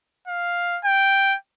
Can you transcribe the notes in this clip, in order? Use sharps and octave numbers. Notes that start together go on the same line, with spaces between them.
F5
G5